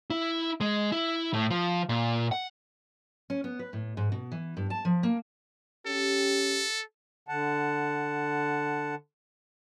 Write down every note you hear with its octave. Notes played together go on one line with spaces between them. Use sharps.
E4
G#3
E4
A2
F3
A#2
F#5
C#4
B3
B4
A2
G#2
B2
E3
G2
A5
F3
A#3
C#4 G4 A4
D3 F#5 A5